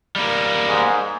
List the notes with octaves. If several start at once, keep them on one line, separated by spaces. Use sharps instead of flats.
G3 A#3
G#2